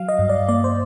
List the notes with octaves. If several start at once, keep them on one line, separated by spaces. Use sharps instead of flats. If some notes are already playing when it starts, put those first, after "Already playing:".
Already playing: F#3 F5
D#5
G2
D5
A#3 D5
C5